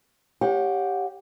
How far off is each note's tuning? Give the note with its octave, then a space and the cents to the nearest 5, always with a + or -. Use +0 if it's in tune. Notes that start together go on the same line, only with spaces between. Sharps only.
G4 +0 C#5 +0 F#5 -35